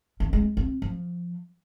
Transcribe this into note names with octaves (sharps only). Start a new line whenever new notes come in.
D#3
G#3
C4
F3